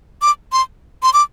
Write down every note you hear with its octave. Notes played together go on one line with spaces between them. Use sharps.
D6
C6
C6
D6